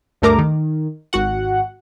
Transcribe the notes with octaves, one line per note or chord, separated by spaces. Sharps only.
D2 G2 A3 A#4 A#5 D6
D#3
G#1 F#4 F#5